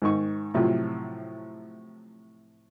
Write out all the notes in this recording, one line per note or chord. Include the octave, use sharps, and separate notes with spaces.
G#2 D#3 C#6
A2 C3 F3 F#3